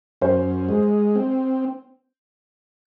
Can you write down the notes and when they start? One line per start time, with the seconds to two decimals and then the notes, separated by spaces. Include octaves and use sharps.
0.22 F#2 C5
0.69 G#3
1.15 C4